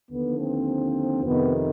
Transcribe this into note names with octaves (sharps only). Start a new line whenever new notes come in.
D#2 D3 F3 B3
C4
F2 C3 D#3 B3